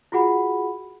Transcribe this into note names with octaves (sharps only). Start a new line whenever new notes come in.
F4 F#4 G#4 F#5 B5